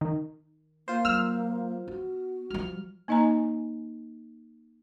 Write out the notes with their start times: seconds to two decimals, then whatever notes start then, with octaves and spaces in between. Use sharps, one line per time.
0.01 D#3
0.88 A#3 F4 C5
1.05 F#3 E6 F6
1.88 B3 F#4
2.50 F3 G3 F6
3.08 A#3 D#4 D#5 G#5 A#5